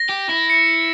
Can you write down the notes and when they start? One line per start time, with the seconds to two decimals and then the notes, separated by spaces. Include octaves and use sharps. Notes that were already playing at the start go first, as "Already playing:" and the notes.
Already playing: A#6
0.10 G4
0.29 E4
0.50 C#7